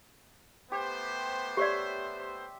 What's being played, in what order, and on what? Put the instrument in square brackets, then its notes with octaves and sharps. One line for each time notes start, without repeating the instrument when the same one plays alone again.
[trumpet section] A3 B3 C5 [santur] G4
[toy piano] G4 C#5 D5 [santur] E5 C6